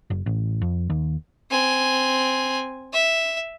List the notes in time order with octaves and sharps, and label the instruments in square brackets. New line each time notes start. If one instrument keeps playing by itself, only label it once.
[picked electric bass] F#1
A1
F2
D#2
[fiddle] C4 G#5
E5